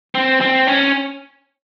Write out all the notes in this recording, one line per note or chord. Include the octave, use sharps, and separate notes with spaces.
C4
C4
C#4